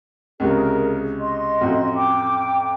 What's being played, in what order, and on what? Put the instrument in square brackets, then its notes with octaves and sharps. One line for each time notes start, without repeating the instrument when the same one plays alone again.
[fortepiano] C#2 C3 [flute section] G#4 A#4
[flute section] D#5 C6
[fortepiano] A1 F2 F#4
[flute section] G5 D6